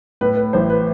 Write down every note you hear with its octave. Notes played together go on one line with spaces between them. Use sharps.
A2 B4
B4
A1 C5
B4